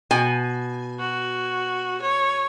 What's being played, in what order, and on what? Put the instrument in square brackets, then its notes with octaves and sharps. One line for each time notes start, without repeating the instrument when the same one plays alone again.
[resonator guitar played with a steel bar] B2 G#5
[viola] F#4
C#5